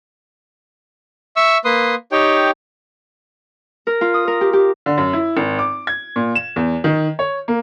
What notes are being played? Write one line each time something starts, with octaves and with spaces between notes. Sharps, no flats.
E5 C#6 E6
A#3 B4 C6 D#6
D#4 G4 C#5 G5
A#4
F4
D#6
A#4
G4
G4
D3
F#2
E4
G#1
D6
G#6
A#2
E7
E2
D#3
C#5
A#3